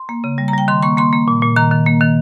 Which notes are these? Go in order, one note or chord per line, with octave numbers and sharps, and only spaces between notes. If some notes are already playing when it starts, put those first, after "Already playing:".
Already playing: C6
A#3
C#3
G3
A#5
G3 G5
D#3 C6
A#3 C#6
A#3 C6
A#3
A#2
A#2
D#3 A#5
D#3
A#3
D#3